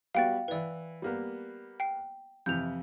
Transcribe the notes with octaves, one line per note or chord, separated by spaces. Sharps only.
G3 B3 F#4 F5 G5 A6
E3 E4 B4 D5
G3 A#3 B3
G5 C7
F2 C3 E3 G6 F7